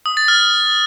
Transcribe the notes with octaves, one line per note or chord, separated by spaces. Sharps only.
D#6
A6
F6